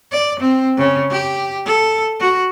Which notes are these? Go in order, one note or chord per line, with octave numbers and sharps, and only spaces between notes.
D5
C4
C#3
G4
A4
F#4